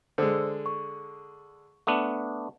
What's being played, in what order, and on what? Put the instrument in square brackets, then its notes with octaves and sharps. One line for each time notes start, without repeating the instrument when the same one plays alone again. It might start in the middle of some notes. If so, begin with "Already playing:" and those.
[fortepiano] D3 G#3 [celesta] C5 D5 E6
[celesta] C#6
[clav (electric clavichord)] A3 B3 D4